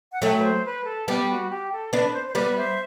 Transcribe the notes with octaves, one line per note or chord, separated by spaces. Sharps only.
F#5
F#3 A3 E5 G5
B4
C5
B4
A4
G3 B3 G4
F#4
G4
A4
B3 D4 B4
C5
C5
G3 B3 B4 D5
C5 E5